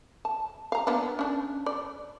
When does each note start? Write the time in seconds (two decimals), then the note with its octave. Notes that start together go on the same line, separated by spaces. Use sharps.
0.25 A5
0.72 F5 A#5
0.87 A#3 B3 D4
1.19 C#4 D4
1.66 D5